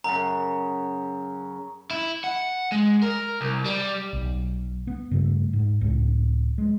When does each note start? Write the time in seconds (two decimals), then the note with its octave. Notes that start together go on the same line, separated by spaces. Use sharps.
0.04 F#2 C#3 A#5
1.91 E4
2.24 F#5
2.72 G#3
3.03 A#4
3.41 C2
3.65 G3
4.13 B1
4.87 B3
5.11 G2 C#3 G3 A3
5.53 G#2
5.81 C#2 A2
6.58 G#3